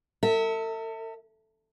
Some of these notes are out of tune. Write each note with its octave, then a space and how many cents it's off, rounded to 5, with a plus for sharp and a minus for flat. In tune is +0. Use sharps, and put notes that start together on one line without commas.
A4 +40 E5 -25